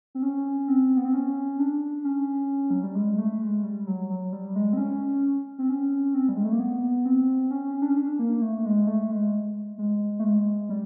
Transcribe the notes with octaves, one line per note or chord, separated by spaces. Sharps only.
C4
C#4
C4
B3
C4
C#4
D4
C#4
F#3
G3
G#3
G#3
A3
G#3
G3
F#3
F#3
G3
G#3
C4
C#4
C4
C#4
C4
G3
G#3
A3
A#3
B3
C4
C#4
C#4
D4
C#4
D4
A#3
A3
G#3
A3
G#3
G#3
A3
G#3
G3